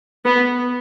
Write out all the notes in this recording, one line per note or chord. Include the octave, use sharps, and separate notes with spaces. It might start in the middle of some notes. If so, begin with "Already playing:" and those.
B3